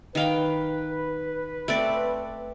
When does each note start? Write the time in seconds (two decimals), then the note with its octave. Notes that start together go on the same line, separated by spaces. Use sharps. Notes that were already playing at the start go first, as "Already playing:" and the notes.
0.15 D#3 B4 F5 G5
1.68 A3 C4 D5